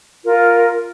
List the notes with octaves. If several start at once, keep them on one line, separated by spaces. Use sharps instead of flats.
F4 A#4